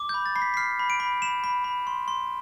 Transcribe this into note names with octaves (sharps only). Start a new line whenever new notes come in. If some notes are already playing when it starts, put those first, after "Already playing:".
Already playing: D6
B5 G6
A6
B5 C7
B6
B6
F6 C7
B5
D7
B5
B5 E7
B5
B5
C6
C6